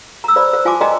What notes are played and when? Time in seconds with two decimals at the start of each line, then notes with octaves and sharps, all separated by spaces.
0.24 A#5 E6
0.36 C5 D5 B5
0.53 C5
0.65 F4 G#5 A5 C6 D6
0.81 D5 D#5 G5 G#5 A#5 C6